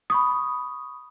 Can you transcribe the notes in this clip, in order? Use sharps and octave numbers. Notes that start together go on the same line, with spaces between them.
B5 C#6 D#6